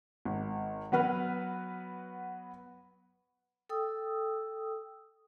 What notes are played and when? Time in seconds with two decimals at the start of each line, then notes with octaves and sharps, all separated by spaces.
0.25 G#1
0.92 F#3 B3 F#4 B4 F6
3.69 A4 G5 D#6 E6